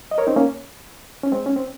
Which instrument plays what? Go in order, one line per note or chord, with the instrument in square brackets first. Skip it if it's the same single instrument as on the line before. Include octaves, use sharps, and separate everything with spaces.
[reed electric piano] D#5
A#4 C#5
C4 D#4
A#3 C#4
C#4
G#3 C4
C#4
C4